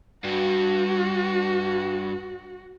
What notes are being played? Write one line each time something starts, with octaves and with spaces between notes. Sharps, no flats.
G2 F#4